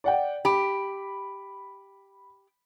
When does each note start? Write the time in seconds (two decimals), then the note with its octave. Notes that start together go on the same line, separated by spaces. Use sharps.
0.04 D5 F#5 G5
0.45 G4 B5